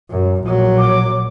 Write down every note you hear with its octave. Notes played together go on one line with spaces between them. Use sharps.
F#2
A#1 F#3
D6